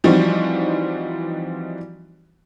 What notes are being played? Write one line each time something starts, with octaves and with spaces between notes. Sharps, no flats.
E3 F3 G3 C4 D#4 F#4